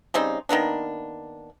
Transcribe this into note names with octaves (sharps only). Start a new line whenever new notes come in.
C#3 G3 C4 D#4
D#3 A#3 B3 D4